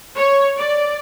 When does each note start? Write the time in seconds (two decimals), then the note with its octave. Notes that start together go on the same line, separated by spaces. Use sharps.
0.15 C#5
0.57 D5